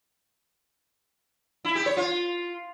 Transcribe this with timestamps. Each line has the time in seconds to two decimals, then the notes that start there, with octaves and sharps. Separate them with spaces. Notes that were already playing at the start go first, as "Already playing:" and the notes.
1.65 E4
1.75 G4
1.86 C#5
1.97 F4